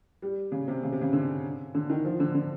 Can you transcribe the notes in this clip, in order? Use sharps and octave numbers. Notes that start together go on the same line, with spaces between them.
G3
C#3
C3
C#3
C3
C#3
D3
D3
D#3
F3
D3
D3